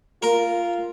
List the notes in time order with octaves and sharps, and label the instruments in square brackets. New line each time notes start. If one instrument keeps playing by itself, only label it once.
[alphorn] F4 [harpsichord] A#4